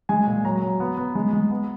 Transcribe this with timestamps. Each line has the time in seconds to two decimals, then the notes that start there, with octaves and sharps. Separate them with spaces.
0.09 G#3 G#5
0.27 A#2
0.45 F#3 A#5
0.62 F#3
0.80 B3
0.97 B3
1.15 G#3
1.33 G#3
1.51 B3